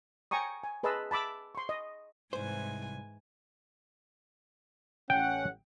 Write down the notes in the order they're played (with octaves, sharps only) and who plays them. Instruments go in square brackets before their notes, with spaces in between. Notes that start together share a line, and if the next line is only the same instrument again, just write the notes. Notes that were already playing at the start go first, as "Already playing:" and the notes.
[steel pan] G5 G#5 A#5 C#6 D#6
G#5
G#4 B4 D#5 A5 C6 E6
A5 B5 D6 E6
C6 C#6
D#5
[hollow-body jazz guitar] C2 C5 [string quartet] G#2 E3 G#5
[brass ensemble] A1 C#4 F#5 [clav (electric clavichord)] G5